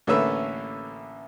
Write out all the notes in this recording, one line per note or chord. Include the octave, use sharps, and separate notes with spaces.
A1 D3 A#3 C#4 B4 E5